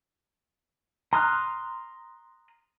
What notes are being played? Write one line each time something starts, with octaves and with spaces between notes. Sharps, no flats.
A#5 C6 D#6 F6 F#6